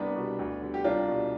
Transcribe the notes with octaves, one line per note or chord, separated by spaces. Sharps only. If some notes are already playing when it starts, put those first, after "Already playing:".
Already playing: C2 B3 D4
B2 G3
D2
D3 G3
G4
C2 D4 F4
B2 G3